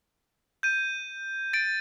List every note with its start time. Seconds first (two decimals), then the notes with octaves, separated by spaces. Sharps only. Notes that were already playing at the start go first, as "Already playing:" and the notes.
0.63 G6 D#7
1.53 A6 D7